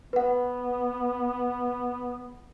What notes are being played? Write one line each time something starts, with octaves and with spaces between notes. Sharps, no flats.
B3 B4 F#5